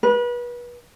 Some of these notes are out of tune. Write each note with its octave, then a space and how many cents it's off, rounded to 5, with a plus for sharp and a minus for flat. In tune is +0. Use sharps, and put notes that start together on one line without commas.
B4 -30